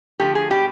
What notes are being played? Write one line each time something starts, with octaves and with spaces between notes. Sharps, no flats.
D3 F3 A3 G4
G#4
B2 G3 G4